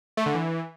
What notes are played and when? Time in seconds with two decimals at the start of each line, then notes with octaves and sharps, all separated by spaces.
0.17 A3
0.26 D3
0.35 E3